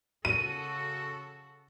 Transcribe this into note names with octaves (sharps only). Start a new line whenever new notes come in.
C#3 F#4 A4 D#7